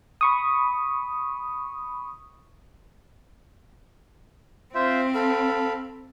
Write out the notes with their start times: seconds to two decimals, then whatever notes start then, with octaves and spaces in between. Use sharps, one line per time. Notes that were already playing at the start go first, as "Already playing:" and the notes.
0.21 B5 C#6 D#6
4.75 C4 F4 C5 E5
5.14 A4 F5 B5